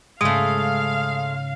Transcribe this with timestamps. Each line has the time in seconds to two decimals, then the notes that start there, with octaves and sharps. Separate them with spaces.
0.21 G#2 C#3 G#3 A3 F5 D#6